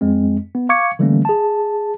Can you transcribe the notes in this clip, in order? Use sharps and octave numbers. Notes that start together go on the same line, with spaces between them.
F2 G#3 C4
B3
F5 C#6 D6 G#6 C#7
D3 E3 G3 A3 A#3 C#4
G#4 A5